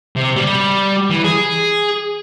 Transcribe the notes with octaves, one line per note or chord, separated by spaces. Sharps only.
C3
G3
E3
G#4